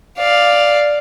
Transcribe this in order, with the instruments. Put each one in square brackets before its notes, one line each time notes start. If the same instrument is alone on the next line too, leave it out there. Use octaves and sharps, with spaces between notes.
[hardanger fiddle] D5 F5